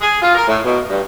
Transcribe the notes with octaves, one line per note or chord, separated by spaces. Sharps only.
G#4
F4
A#4
A2
B2
G2